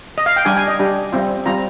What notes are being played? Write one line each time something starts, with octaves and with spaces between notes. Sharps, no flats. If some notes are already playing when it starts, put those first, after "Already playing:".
D#5
F5
G5
G3 D4 G4 G#5
G#5
D#5
G3 D4 G4
G3 C4 F4
G3 C4 F4 A#5